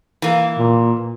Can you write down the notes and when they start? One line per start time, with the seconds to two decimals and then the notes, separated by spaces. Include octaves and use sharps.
0.22 E3 A#3
0.58 A#2